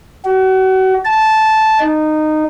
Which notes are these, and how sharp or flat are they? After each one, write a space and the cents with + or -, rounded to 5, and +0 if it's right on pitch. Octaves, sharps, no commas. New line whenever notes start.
F#4 +35
A5 -10
D#4 -15